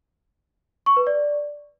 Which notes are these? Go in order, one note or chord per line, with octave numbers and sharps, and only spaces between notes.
C#6
B4
D5